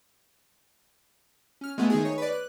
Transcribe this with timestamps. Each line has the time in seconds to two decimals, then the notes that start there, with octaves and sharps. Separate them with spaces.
1.61 C#4 F6
1.78 G#3 A3 B3
1.90 D#3 D#4 G#4
2.05 C#5
2.18 B4 D5
2.32 F#6